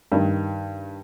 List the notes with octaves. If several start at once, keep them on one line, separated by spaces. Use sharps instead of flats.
G2 D#3